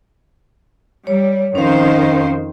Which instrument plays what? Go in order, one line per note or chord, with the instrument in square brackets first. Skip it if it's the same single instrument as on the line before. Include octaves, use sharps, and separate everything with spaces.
[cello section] G3 [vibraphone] C#5
[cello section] F2 D#3 C5 [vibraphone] C#4 F5